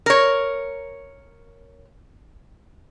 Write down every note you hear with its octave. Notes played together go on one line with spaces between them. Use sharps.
A#4 C#5